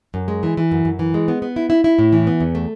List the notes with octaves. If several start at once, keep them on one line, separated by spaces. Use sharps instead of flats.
F#2
G#3
E3
E3
F#2
F#2
E3
G#3
B3
B3
E4
E4
E4
A2
E3
B3
E2
A3